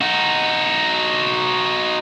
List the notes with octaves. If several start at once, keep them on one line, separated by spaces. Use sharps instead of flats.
D#4 F#4